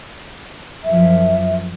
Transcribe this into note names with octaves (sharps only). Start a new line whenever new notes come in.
F#2 F3 E5